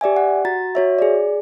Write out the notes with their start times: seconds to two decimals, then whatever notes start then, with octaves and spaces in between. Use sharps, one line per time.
0.01 G4 D5 E5 G#5
0.17 F#5
0.45 F#4 A#5 A6
0.75 F#4 C#5 E5
0.99 G#4 D5